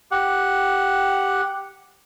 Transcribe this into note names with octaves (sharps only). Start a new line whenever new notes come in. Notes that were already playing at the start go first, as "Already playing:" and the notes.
G4 F#5